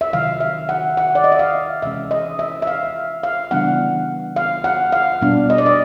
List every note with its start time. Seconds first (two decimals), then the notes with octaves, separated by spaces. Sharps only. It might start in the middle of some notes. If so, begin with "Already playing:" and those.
0.01 E5
0.13 C3 D#3 F#3 F5
0.40 E5
0.69 F#5
0.97 F#5
1.15 D5
1.24 D#5
1.32 E5
1.39 F5
1.82 C3 E3 G#3 C#4 E5
2.11 D#5
2.39 E5
2.62 E5
2.67 F5
3.23 F5
3.51 C#3 E3 G3 B3 D4 F#5
4.36 F5
4.64 F#5
4.92 F5
5.22 B2 G3 B3 D4
5.50 D#5
5.58 D5
5.66 D#5